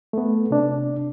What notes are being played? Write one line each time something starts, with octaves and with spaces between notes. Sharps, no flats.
A3 B3
C3 D4